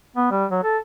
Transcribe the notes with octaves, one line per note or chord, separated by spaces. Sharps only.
B3
G3
F#3
A4